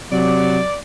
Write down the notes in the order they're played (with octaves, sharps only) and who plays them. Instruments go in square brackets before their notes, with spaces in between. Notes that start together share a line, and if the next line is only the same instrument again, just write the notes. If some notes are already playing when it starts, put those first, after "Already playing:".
[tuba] C3 [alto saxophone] F#3 [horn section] D5